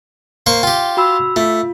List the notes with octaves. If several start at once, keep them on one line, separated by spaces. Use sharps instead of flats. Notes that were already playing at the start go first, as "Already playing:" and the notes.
A#3 C5 C#6
F4 G4 G5
F#4 B5 E6
A3 F4